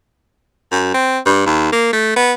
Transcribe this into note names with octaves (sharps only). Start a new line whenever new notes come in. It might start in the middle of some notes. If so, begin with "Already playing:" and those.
F#2
C4
G2
D#2
A#3
A3
B3